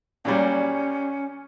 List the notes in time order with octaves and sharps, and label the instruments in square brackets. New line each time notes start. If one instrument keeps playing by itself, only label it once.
[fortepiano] A#2 F#3 G3 [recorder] C#4